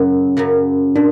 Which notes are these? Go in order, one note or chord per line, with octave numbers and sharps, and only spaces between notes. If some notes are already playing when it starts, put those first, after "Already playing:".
Already playing: F#2 C#3 F#3 C#4
F#2 C#3 F#3
A#2 D4